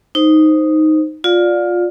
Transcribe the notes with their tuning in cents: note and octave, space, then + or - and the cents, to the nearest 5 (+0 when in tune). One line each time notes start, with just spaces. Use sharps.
D#4 +0 C5 +0
F4 +15 D5 +0 F5 +40